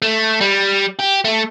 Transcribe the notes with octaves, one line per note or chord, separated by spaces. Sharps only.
A3
G3
G4
A3